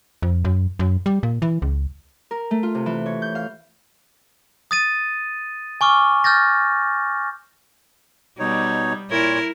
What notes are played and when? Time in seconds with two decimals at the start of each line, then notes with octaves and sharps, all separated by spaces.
0.22 F2
0.45 F#2
0.79 F#2
1.06 G3
1.23 A#2
1.42 E3
1.62 C#2
2.31 A#4
2.51 A3
2.63 F4
2.75 C3
2.86 E3
3.06 C#5
3.22 G6
3.35 F5
4.71 D#6 A6 D#7
5.81 G#5 C#6 D6 F6
6.24 F6 G6 A6 A#6
8.39 B2 G3 D#4 C#5
9.10 A#2 E4 A#4 C#5